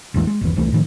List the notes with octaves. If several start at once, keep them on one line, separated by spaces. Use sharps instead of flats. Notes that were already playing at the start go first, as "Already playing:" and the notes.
A1 E2 E3 G#3
G#3
G1 E2 E3
D#1 C2 E3 A3
A2 D#3 F3